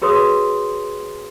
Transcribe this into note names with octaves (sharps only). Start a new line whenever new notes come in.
F#4 G#4 B4 C#5 C6 D#6